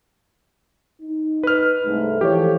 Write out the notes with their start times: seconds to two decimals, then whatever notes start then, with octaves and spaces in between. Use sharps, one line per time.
1.02 D#4
1.43 B4 F6
1.86 C2 G#2 A3
2.21 E3 F3 G4 A4 C#5